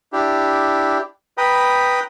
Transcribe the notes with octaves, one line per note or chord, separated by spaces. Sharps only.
D4 E4 G4
B4 G5 A#5 B5 D#6